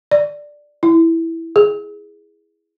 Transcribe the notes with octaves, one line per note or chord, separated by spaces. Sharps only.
D5
E4
G#4